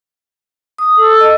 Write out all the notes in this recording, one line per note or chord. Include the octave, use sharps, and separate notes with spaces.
D#6
A4
D#5